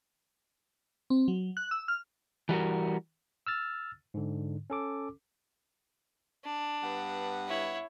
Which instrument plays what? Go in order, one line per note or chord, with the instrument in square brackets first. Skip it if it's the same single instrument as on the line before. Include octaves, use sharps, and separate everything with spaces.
[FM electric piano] C4
F#3
F#6
E6
F6
[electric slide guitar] E3 G3 F#4 A#4
[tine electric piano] E6 F6 A6
G#2 D3
C#4 A4 D6
[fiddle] D4
[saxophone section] G2 B3 F#5
[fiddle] E4 C#5